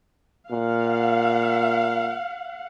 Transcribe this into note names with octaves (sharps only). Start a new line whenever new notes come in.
A#2 F5 F#5